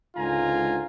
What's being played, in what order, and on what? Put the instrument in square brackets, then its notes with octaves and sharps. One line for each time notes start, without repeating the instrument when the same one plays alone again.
[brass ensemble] C#2 G#2 D3 F4 G#5 A#5